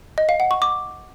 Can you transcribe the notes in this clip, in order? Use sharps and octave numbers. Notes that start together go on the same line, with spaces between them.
D#5
F5
F#5
C#6
D6